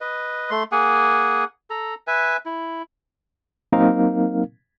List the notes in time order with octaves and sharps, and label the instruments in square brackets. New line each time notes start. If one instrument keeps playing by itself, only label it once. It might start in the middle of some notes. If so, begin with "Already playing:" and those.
[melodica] B4 D#5
A3 C6
A#3 G#4 F#5 G#5
A4 A#5
B4 E5 G#5
E4
[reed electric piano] F#3 A#3 C4 D#4 A#4 F5